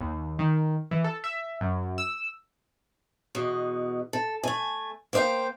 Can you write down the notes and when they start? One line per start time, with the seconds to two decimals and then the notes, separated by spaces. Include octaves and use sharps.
0.01 D#2
0.39 D#3
0.91 E3
1.04 A4
1.24 E5
1.61 F#2
1.98 E6
3.35 E2 B2 D#5
4.13 A4
4.44 A3 G#5
5.13 A#3 C5 D5 F5 G5